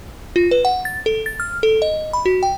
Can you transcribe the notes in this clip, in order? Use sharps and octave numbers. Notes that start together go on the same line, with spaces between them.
F4
B4
F#5
A6
A4
A6
F6
A4
D#5
B5
F#4
G5